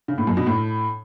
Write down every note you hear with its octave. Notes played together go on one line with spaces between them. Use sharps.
C#3
A2
F#2
B2
A2